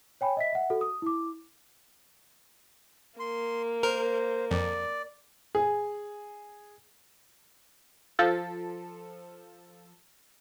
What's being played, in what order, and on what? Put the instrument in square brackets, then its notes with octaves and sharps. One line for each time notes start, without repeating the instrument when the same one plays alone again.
[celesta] C#5 G5 G#5 B5
D#5 E5 B6
E5 F#5
F#4 A4
D#6
E4 D6
[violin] A#3 [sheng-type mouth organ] C6
[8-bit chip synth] A#4 [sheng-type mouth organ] C5
[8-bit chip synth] F2 [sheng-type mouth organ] D5
[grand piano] G#4
[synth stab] F3 A4